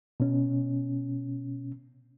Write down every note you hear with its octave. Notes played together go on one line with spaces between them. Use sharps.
B2 C#4